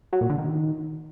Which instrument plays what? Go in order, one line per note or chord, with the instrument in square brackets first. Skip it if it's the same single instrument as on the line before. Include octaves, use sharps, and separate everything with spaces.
[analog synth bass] F#3
A#2
D3
D#3